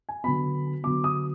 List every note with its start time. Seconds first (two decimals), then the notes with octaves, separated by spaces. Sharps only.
0.09 G#5
0.24 D3 F#3 B3 B5
0.83 D3 F#3 B3 D6
1.04 D#6